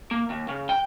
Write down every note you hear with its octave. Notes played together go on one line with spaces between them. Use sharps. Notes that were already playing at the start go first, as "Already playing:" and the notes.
A#3
D#2
C#3
G5